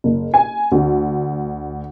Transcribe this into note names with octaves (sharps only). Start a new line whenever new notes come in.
F#1
G#5
D2